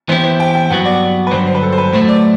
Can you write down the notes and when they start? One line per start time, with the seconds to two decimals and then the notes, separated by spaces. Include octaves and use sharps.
0.09 E3 B3 E4 G4 C5
0.24 C5
0.40 G5
0.55 G5
0.70 G2 F#3 B3 F#4 F#5
0.85 D5
1.27 B4
1.31 G2 D3 F#3 C5
1.47 C5
1.55 B4
1.62 A4
1.72 C5
1.78 B4
1.93 A2 F#3 A3 C5
2.09 D5